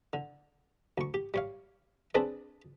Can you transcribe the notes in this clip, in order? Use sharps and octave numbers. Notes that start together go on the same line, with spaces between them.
D3
D2 C#6
G4
G3 C#5 F5
C4 D4 G#4 A4 B4 D5